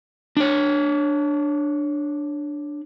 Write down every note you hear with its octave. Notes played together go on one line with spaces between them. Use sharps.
D4 C#5